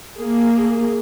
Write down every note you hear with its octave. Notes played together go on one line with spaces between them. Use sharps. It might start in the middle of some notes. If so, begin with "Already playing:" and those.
A#3 G#4